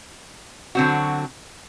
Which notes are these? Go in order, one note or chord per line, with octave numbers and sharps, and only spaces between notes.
D3 F#3 C4 F#4